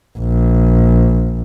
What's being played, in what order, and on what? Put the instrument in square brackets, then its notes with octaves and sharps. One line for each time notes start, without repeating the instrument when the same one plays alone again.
[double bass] A#1